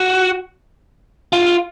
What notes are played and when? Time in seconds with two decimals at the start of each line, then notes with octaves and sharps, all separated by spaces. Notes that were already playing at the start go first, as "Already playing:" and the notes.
Already playing: F#4
1.33 F4